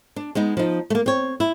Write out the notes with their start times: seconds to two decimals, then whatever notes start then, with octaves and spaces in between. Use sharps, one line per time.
0.16 D4
0.35 G#3 B3 D#4
0.57 F3 D#4
0.90 A3 A#3
1.06 C4 C#5
1.40 E4